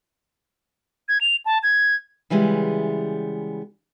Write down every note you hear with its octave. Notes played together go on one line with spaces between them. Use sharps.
G#6
F7
A5
G#6
C#3 E3 G3 G#3 B3